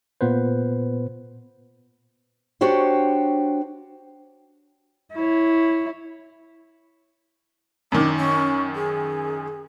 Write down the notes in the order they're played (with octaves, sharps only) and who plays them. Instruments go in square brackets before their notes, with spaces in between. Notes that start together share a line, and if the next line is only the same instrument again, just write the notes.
[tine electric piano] A#2 B3 B4 C5
[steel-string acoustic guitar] D4 F#4 G4 C5 C#5
[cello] E4 C#5
[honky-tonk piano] F#2 D#3 [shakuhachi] D4
[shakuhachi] C#4
G#4